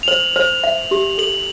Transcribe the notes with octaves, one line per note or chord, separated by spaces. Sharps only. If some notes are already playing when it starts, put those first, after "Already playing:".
F7
C5 F#7
C5
E5
G4
A4 F#7